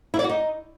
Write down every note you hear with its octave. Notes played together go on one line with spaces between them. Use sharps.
E4
D5
F#4
D#4